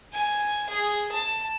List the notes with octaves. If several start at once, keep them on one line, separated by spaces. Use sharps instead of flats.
G#5
G#4
A5